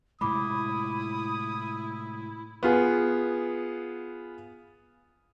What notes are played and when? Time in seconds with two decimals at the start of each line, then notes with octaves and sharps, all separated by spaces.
0.21 A2 C3 G#3 E4 B5 D6 D#6
2.63 B3 F4 G#4